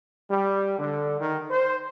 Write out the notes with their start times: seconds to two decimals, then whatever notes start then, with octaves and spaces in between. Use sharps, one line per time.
0.29 G3
0.79 D3
1.20 D#3
1.51 C5